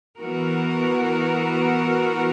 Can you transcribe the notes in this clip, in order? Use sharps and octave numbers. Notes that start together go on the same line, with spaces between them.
E3 B3 F#4 A#4